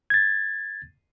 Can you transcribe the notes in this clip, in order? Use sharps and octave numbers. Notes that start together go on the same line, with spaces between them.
G#6 A6